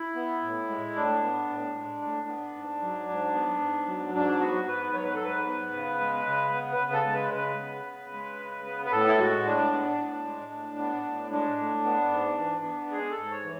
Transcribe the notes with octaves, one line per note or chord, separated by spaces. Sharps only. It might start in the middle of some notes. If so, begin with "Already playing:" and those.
Already playing: E4
B3
A2
G#3
A2 D4
B3
A2
G#3
A2
B3
G#2
F#3
G#2
B3
G#2
F#3
G#2 D4
B3 F#4
G#2 B4
F#3 C#5
B4
A4
G#2 B4
B3
C#3
G#3
C#3
B3
B4
C#3
A4
G#3
B4
C#3 B4
B3
C#3
G#3
C#3
B3
B4
A2 A4
E4
G#3 F#4
A2 D4
B3
A2
G#3
A2
B3
A2
G#3 D4
A2
B3
G#2
E3
B3
G#3 G#4
A4
G#2
C#5
E3